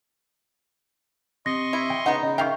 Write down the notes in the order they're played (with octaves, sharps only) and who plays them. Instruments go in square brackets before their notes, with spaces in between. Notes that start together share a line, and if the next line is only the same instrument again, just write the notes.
[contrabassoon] C3 [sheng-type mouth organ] D#5 C6 C#6 [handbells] A#6
[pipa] E4
[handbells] G5
[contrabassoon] C#3 [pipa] B3 D#4 [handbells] F#5
[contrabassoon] C#3 [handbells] D#5
[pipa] D#3 F5 G5 [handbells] E5 C#6